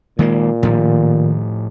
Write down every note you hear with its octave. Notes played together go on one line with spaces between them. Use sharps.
A#2 D#3 G#3 A#3
A2 D#3 F3